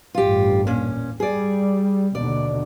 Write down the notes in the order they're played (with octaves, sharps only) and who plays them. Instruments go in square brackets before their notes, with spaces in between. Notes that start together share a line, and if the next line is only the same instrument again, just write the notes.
[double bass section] A1 E2 G2 [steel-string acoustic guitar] F4 G4
[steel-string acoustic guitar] A#2 C#4
[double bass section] G3 [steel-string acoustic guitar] G#4 D5
[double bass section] D#2 B2 D3 [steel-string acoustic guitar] D5